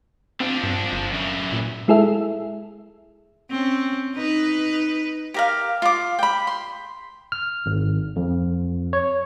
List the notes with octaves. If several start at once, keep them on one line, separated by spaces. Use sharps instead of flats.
F3 C4 D4
G2
G1
F#2 E3
A#2
G#3 E4 G#4 A4 E5
C4 C#4
D#4 B4
G4 A#4 F5
F4 D6
G5 B5
C6
F6
G#1
F2
C#5